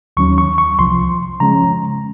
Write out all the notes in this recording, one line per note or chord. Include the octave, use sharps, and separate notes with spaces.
D#2 D#3 F#3 C#4 C#6
C#6
C#6
C2 C3 F3 C6
C#3 F3 G#3 C#4 A#5